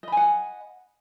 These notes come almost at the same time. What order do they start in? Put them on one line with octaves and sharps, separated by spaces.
D#5 B5 G#5 F#5